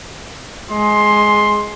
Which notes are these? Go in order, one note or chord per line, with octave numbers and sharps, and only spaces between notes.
G#3 C6